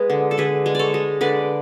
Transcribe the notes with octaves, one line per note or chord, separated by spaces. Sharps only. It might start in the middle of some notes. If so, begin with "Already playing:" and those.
Already playing: G#3 B3 B4
D3
A4
D3 G#4 B4
G#3
A4 C#5 D5
G#3
D3 B4 D5